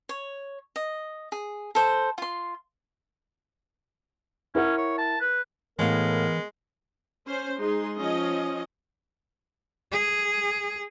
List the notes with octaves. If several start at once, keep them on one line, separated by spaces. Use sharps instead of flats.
C#5
D#5
G#4
A4 C5
F4 C6
C#4 E4 A#4 F#5
C#5
A5
B4
A2 E3 G#3 B3 A#4 F5
C#4 C5
G#3 D#4 G#4 C6
F3 C#4 D#5
G#4